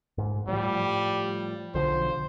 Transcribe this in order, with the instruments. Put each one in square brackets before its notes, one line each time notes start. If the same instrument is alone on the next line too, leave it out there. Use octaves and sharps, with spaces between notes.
[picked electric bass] G#2
[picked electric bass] A2 F3 [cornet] G3
[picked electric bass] B1 D3 F3 [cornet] C5